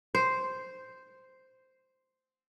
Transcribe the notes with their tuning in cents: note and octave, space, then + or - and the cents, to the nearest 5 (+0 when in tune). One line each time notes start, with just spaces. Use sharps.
C5 -5